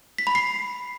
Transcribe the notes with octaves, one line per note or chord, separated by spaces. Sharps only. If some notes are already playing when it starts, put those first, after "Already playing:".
B6
B5
C7